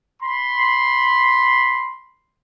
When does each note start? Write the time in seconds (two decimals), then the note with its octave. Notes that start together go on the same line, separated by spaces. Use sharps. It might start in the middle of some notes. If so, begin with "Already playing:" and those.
0.23 B5 C6